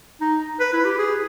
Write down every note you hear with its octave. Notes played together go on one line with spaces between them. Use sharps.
D#4
B4
E4
G4
G#4